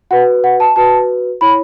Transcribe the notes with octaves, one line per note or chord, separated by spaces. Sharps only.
F#4 B4 F#5
F#5
A5
F#4 B4 A5
E4 C#5 B5